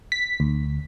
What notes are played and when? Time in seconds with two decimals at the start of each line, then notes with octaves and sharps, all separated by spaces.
0.12 B6
0.40 D2